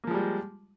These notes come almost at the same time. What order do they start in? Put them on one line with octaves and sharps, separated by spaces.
A#3 F3 G#3 G3